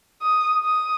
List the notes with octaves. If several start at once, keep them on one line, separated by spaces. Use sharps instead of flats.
D#6
D#6